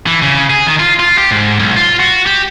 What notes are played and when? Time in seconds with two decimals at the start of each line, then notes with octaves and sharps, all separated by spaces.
0.06 E3
0.22 C#3
0.50 G#4
0.67 D#3
0.80 F4
1.00 F4
1.18 G4
1.31 G#2
1.59 B1
1.76 F4
2.00 F#4
2.26 G4